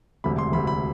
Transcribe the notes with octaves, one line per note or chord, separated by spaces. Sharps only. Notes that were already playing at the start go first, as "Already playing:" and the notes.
E1 D2 C3 B5
C6
E1 D2 C3 B5
B5